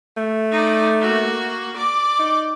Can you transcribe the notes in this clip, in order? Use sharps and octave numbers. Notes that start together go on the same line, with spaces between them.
A3
D#4 D5
A#3 F#4
D5 D6
D#4